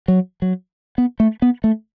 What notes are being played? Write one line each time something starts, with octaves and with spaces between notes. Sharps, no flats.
F#3
F#3
B3
A3
B3
A3